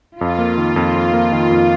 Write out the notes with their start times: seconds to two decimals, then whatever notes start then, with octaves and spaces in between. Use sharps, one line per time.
0.21 F2 F4
0.39 A#3
0.57 D#3
0.76 F2
0.95 F2
1.13 A#3
1.32 D#3
1.51 F2